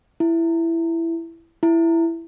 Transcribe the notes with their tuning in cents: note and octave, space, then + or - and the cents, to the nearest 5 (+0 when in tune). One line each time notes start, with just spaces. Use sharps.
E4 +10
E4 +10